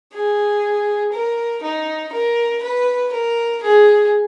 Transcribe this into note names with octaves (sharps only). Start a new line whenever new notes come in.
G#4
A#4
D#4
A#4
B4
A#4
G#4